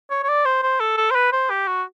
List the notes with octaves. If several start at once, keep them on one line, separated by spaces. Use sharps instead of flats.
C#5
C#5
D5
C5
C5
A4
A4
C5
B4
C5
G4
F#4